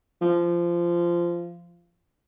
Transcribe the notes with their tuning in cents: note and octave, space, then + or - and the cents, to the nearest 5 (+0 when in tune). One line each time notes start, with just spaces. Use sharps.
F3 -20